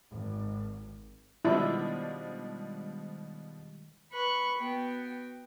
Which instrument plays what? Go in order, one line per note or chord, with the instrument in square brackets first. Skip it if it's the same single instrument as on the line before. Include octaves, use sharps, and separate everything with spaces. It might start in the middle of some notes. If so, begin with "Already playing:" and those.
[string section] G#1
[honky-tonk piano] B2 F3 D4 [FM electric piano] D#3 G3 G#3 [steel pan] E4
[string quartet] B4 B5 C#6 F#6
B3 F#4 G5